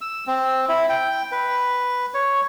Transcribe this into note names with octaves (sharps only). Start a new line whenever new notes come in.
E6
C4
E4
G5
B4
C#5